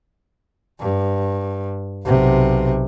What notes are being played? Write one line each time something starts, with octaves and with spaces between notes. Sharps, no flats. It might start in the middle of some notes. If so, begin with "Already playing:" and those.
G2
B1 C3